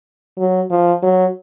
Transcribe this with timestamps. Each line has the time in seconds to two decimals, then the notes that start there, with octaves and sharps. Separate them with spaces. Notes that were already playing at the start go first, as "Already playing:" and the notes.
0.38 F#3
0.71 F3
1.03 F#3